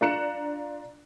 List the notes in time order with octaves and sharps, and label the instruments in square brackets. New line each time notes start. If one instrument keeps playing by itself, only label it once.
[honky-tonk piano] D4 F4 A#5 F#6 C#7 E7